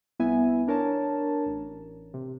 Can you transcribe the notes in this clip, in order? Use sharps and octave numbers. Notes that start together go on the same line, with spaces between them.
C2 B3 E4 E5 G#5
D4 A#4 C#5 A5
A1
C3